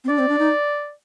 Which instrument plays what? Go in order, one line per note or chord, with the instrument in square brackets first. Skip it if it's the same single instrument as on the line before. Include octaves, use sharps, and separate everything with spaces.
[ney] C4
[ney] D4 [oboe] D5
[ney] C4
D4
D#4